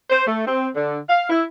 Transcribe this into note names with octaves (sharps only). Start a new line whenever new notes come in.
C5
A3
C4
D3
F5
E4